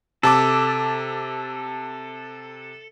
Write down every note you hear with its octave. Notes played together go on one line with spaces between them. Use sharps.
C3 A4 A5 D6